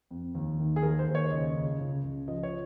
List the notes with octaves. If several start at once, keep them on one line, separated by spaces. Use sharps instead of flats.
F2
D#2
D#3
G#4
D#2 A#4
C5
D#2
C#5
C#2 D#5
C#2
C#2
C#2
F3 D#5
C#5